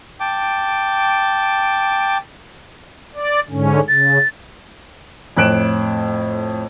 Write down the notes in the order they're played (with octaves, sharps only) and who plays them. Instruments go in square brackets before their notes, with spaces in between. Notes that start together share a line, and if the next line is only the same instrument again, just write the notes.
[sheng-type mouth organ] G5 A5 D6
[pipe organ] D5
G#2 D3 C#4
[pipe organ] C#3 [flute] A6
[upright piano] F2 A2 F#6 D7 E7